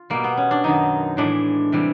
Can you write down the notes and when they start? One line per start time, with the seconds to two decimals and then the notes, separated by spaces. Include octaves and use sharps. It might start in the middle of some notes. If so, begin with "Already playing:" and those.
Already playing: F4
0.10 B2 G3 A#3
0.24 B3
0.37 C#4
0.51 D4
0.64 F#2 D#3 F#3 D#4
1.17 A2 E3 G#3 D4
1.72 C3 E3 G3